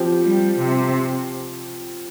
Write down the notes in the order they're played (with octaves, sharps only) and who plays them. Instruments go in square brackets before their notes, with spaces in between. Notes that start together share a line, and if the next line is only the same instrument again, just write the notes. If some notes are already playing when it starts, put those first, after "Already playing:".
Already playing: [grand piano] F3 C4 G4
[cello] G3
C3